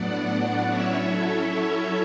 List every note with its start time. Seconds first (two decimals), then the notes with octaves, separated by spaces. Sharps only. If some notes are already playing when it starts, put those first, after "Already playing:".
Already playing: A2 F#3 B3 D4 D5 F#5
0.69 F#3 C#4 E4 C#5 E5
1.06 A4 C#5
1.43 A4 C#5